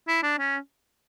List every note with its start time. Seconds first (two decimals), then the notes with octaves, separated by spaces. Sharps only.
0.08 E4
0.23 D4
0.39 C#4